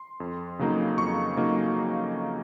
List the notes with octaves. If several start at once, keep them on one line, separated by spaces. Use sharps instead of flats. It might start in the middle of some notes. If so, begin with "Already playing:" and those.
Already playing: C6
F2
C#3 F#3 A#3 D#4
F2 C#6
C#3 F#3 A#3 D#4